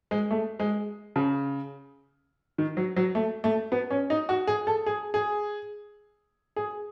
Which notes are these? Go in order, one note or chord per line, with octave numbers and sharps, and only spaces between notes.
G#3
A3
G#3
C#3
D#3
F#3
F#3
A3
A3
B3
C#4
D#4
F#4
G#4
A4
G#4
G#4
G#4